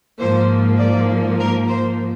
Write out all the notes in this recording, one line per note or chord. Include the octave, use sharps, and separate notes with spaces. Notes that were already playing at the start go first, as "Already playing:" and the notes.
G#2 F3 A#3 C5
D5
A#4
C5